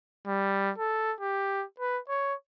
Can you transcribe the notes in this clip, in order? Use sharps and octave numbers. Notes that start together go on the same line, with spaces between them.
G3
A4
G4
B4
C#5